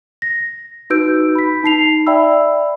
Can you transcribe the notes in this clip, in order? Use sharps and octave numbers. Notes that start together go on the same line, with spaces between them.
A#6
D#4 F#4 B4 E6 G6 D7
B5 B6
D#4 A5 C7 F7
D5 E5 G5 B5 E6